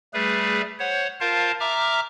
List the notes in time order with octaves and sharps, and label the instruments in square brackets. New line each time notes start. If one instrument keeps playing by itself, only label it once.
[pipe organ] G3 A3 G#4 B4
C5 C#5 F#5
F4 A#4 C5 F5 A5
E5 A#5 D6 F6